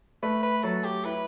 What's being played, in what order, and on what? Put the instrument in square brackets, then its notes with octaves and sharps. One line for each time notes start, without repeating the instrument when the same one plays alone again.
[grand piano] A3 [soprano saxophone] B4
[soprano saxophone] B4
[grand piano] F#3 [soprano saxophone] A4
[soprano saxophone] G4
[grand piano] E4 [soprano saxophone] B4